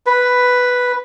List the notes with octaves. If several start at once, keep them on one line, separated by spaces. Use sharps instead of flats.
B4